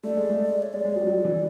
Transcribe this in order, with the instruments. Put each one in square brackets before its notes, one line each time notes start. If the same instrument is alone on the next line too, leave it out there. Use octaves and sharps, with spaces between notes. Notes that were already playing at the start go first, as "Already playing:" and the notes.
[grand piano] A3 [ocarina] D5
[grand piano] G#3
A3
[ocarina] C#5
[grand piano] G#3 [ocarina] D5
[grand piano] G#3
F#3
F#3
E3